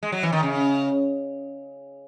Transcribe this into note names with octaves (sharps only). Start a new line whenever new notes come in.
G#3
F#3
E3
D#3
C#3